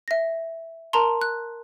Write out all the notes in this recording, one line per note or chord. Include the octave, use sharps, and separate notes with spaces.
E5 A#6
A#4 A5 A#5 C6
F#6